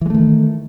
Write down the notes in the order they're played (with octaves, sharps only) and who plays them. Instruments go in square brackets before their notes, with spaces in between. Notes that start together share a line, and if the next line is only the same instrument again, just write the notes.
[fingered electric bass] E3
G#3
A3
D#3